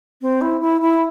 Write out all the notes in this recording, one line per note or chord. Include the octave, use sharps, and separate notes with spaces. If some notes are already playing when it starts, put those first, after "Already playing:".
C4
E4
E4
E4